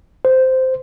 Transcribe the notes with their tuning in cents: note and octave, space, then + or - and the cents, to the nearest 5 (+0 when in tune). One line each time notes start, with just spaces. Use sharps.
C5 -10